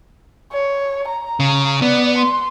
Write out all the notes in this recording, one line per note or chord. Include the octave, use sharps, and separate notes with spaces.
C#5
A#5
C#3
B3 D5
C6